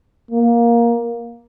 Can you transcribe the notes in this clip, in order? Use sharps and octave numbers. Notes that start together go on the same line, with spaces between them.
A#3